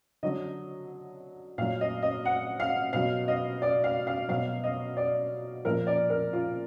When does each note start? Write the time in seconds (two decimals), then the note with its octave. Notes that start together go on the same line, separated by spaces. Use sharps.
0.23 D3 F#3 D#5
1.58 A#2 F#3 F5
1.81 D#5
2.02 D#5
2.25 F#5
2.60 F5
2.93 B2 F#3 F5
3.28 D#5
3.62 D5
3.84 F5
4.07 F5
4.29 B2 F#3 F5
4.64 D#5
4.97 D5
5.65 A#2 F3 A#4
5.87 D5
6.10 A#4
6.33 F4